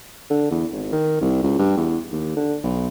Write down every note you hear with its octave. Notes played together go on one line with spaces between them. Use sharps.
D3
E2
G#1
D#3
C2
C#2
G2
E2
D#2
D3
B1